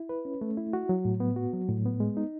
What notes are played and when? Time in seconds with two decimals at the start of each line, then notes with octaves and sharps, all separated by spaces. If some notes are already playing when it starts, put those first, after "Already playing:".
Already playing: E4
0.09 B4
0.25 C#4
0.41 A3
0.57 E4
0.73 F#4
0.89 F#3
1.05 A2
1.20 B3
1.36 F#4
1.53 F#3
1.69 A2
1.85 B3
2.00 G#3
2.17 D#4